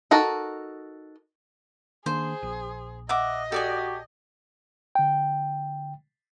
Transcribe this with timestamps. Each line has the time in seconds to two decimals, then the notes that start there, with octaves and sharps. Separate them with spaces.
0.11 D#4 F#4 A4 A#4
2.06 D#3 A#3 D4 G#4 C5
2.43 A#1
3.09 D#5 E5 F#5 D6
3.52 F#4 G4 A4 D5 G#5
4.95 D3 G5